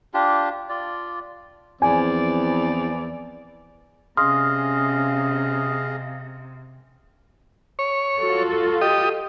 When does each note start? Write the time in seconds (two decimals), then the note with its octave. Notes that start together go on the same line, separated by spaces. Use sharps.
0.14 D4 F4 G4
0.69 F4 D5
1.82 E2 F3 C4 D5 G#5
4.17 C3 C#4 G#4 D#5 F5 C6 D#6 F6
7.79 C#5
8.18 F4 F#4 A4
8.81 G4 D#5